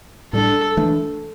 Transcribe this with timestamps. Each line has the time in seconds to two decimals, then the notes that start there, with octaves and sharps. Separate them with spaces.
0.33 A2 G3 D4 A4
0.77 E3 A3 D4